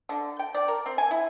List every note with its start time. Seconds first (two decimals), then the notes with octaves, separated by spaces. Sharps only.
0.09 D3
0.39 G5
0.55 D5
0.68 A#4
0.86 C4
0.98 G#5
1.11 E4